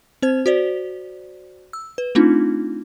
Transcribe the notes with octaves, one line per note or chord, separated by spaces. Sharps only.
C4 C5 G#6
F#4 C5 D5
E6
B4
A3 C4 D4 D#4 F4